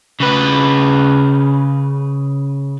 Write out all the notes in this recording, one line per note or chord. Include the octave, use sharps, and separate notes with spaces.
C#3 B4